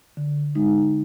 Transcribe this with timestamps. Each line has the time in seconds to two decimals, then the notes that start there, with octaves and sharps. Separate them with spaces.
0.17 D3
0.55 G#3 D#4